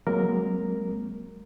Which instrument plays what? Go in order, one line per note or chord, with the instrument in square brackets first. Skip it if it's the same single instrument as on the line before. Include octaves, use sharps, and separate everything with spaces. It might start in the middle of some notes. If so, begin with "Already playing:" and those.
[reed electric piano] F#3 G#3 A#3 C4 A#4